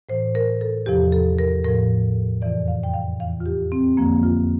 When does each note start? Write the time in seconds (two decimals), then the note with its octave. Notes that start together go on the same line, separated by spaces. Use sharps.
0.09 A2 E3 C5
0.35 A#4
0.61 A4
0.86 E2 C3 F3 G4
1.12 A4
1.39 A#4
1.64 A2 F3 A#4
2.42 F2 C3 E3 D5
2.68 F5
2.83 G5
2.94 F5
3.20 E2 E3 F5
3.40 F4
3.46 G4
3.72 C4
3.97 F2 D3 F3 A#3
4.23 F4